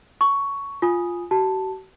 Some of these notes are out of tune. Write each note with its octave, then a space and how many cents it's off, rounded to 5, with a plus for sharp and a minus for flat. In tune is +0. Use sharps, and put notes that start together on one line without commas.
A5 +30 C#6 +10
F4 +0 G#5 +0 D#6 +0
F#4 +45 A5 +0